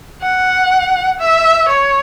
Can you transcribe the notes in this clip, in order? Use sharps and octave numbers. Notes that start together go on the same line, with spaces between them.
F#5
E5
C#5